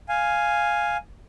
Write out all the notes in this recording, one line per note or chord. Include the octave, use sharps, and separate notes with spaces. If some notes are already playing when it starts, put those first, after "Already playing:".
F5 G#5